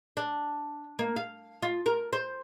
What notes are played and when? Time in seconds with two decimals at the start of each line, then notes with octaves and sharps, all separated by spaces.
0.17 D4
0.99 A#3
1.16 F5
1.62 F4
1.86 A#4
2.13 C5